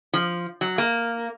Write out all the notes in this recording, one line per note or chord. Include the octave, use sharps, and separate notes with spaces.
F3
F#3
A#3